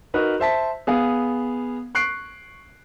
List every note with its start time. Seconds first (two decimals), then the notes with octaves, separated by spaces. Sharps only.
0.14 D#4 F#4 A#4 B4
0.40 C5 E5 A5 B6
0.87 B3 G#4 F5
1.95 C#6 F#6 C7 D7